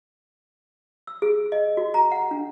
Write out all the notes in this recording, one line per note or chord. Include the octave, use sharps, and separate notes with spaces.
E6
G#4
D#5
F#4
A#5
F#5
D4